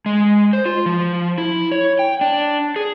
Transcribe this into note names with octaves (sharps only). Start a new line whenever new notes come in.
G#3
C5
F4
F3
E4
C#5
G5
D4
G#4